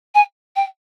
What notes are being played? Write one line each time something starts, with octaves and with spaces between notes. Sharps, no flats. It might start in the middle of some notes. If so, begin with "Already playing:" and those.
G#5
G5